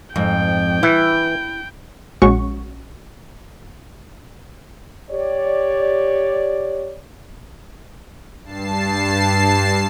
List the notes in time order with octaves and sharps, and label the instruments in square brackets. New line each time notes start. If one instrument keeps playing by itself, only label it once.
[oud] F2 G#2 [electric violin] G5
[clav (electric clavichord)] E3 [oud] E4
[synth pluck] A#1 G#3 C#4 F#4 C#6
[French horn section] G4 C#5 D5
[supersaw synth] G2 A5 C7